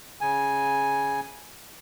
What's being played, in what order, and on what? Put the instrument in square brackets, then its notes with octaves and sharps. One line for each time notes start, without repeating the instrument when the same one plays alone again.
[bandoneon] C#3 G#5